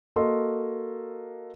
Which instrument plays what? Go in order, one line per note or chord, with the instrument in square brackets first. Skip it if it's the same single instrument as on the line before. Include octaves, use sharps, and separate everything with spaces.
[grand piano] A#3 F#4 A4 D#5 C6